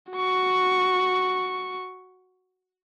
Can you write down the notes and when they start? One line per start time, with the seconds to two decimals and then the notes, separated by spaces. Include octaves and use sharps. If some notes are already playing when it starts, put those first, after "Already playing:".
0.11 F#4 C#6